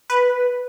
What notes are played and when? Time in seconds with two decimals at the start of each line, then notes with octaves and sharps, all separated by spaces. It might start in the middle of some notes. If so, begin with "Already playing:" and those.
0.10 B4